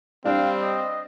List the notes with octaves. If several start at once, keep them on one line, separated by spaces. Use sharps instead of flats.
G3 C4 D4 F5
D#5